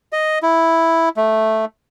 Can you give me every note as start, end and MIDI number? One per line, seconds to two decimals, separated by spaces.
0.12 0.39 75
0.43 1.09 64
1.17 1.65 57